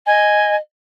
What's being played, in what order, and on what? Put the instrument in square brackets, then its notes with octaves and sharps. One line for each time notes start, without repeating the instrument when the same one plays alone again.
[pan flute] D#5 [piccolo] G#5